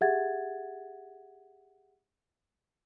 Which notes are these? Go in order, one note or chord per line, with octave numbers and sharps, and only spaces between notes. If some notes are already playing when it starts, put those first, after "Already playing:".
G4 G#4 E5 F#5 G#6 A6